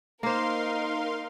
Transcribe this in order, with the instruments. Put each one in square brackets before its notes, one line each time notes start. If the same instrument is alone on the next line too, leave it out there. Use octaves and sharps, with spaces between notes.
[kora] A#3 C5 [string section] D#4 A#4 [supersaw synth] F5 C6